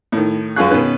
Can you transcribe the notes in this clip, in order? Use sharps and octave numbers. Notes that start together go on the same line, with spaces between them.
A2 D#3
F#2 C#4 F4 G#4 C#6 F#6
B2 D#3 C#4 B4